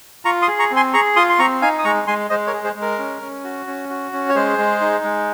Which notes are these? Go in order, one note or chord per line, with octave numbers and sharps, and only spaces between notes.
F4 A#5 C#6
C6 D#6
G#4
A#5 C#6
C4
G#5 C6
G#4 A#5 C#6
F4 C6 D#6
C6
C4 A#5 C#6
D#4 F5 G#5
D#6
G#3 A#5 C#6
G#3 G#5 C6
G#3 C5 D#5
A#4 C#5
G#4
G#4 C5
G#3
A#4
C#4
C#4
F#4
C#4
F#4
C#4
C#5
G#3 G#4 C5
G#3
D#4
G#3